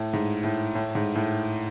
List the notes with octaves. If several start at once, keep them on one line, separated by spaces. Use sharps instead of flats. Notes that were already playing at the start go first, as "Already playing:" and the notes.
Already playing: A2
G#2
A2
A2
G#2
A2